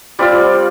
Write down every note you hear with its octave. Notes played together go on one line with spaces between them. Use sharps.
G3 C4 F4 D5